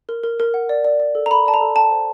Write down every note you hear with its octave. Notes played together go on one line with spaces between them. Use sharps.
A#4
A#4
A#4
F#5
D5
D5
D5
A4
A#5
A4 B5
D5 A5
A#5
A4
G5 A5
C5